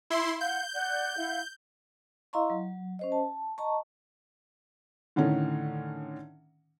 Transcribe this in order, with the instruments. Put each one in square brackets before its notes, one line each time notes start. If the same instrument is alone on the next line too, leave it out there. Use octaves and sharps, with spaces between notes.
[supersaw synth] E4 C6
[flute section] F5 F#5 [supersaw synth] G6
[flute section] D5 F#5 F#6
E4 F5 F#5
[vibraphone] E4 D#5 F5 A#5 C6 C#6
F#3
C#4 C5 D#5
A5
D#5 A5 A#5 C#6
[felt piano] A2 D3 D#3 C#4 D#4